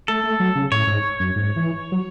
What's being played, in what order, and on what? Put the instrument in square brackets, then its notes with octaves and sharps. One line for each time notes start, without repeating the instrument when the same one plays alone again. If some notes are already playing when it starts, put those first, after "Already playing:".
[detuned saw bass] A3 [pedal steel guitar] A4
[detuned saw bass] A3
F#3
C#3
[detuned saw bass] A2 [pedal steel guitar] C#5
[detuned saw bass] G#2
F#2
G#2
E3
F#3